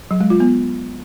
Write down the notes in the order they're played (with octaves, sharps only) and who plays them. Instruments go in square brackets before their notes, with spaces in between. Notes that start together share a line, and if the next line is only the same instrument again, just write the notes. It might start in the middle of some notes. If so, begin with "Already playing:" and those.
[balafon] F#3
G#3
F4
B3